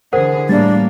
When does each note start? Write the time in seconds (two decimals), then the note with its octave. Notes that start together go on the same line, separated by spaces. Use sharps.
0.13 D3 E3 G#4 A#4 C5 F#5
0.49 A2 G3 A#3 D4 A6